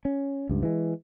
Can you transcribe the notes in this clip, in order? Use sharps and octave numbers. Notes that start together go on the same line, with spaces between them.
C#4
C#2 G2
E3 G#3